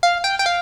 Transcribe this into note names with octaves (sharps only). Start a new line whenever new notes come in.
F5
G5
G5
F5